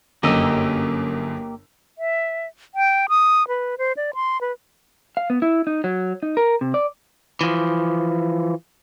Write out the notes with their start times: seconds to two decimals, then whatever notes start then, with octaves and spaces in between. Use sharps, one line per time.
0.23 G1 F#2 A#3 G4 D#5 E6
1.98 E5
2.75 G5
3.09 D#6
3.48 B4
3.78 C5
3.97 D5
4.14 C6
4.41 B4
5.17 F5
5.30 B3
5.42 E4
5.67 D#4
5.84 F#3
6.23 D#4
6.37 A#4
6.61 C3
6.74 D5
7.41 E3 F3